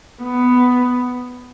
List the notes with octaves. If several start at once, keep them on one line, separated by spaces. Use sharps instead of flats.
B3